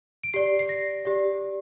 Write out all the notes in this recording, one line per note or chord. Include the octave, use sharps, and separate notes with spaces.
D7
G4 D5 C7
C7
A#6
G4 D5